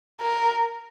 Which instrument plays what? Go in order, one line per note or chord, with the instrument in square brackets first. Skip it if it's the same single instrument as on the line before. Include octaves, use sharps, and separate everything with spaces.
[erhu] A#4